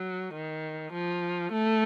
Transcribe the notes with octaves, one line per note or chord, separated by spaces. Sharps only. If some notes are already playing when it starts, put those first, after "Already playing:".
Already playing: F#3
D#3
F3
A3